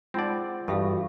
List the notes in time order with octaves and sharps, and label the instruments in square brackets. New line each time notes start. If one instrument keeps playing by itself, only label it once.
[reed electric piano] G#3 F#5 [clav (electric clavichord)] C4 D5 [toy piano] D#4 F4
[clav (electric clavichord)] G2 [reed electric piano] E3 [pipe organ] F#4 [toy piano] A4 E5 F5